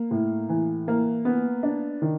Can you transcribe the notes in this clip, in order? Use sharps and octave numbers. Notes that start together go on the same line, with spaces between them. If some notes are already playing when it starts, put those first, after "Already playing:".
Already playing: A#3
A2
E3
A#3
B3
D4
D#3